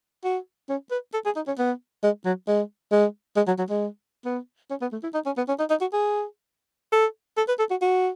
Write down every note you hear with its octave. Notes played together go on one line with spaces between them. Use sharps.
F#4
C#4
B4
A4
G#4
D#4
C#4
B3
G#3
F#3
G#3
G#3
G#3
F#3
F#3
G#3
B3
C#4
B3
A3
E4
D#4
C#4
B3
C#4
D#4
D#4
F#4
G#4
A4
A4
B4
A4
F#4
F#4